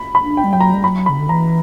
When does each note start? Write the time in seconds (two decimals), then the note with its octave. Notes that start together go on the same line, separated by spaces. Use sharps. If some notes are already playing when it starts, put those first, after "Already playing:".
Already playing: B5
0.15 B5
0.22 D4
0.37 G5
0.44 G3
0.53 F#3 G5
0.60 A#5
0.74 G3
0.84 F#3 B5
1.06 C#3 B5
1.19 D3
1.29 E3 A#5